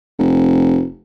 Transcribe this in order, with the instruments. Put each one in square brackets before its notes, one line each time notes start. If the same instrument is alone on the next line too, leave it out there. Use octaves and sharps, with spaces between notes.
[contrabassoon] F1